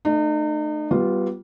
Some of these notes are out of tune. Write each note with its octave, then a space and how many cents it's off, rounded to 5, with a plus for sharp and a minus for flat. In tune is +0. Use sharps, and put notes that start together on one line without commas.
A3 +0 D#4 -40
G3 -20 B3 +0 F4 +0